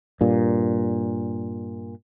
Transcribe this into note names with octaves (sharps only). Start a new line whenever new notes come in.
G2 A#2